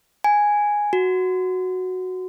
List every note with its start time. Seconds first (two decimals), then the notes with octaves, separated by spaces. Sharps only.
0.24 G#5
0.93 F#4